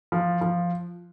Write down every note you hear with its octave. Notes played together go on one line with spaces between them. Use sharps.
F3
F3